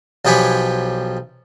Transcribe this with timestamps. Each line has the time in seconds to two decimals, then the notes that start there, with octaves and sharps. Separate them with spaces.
0.25 B1 F3 G4 C#5 G#5 B5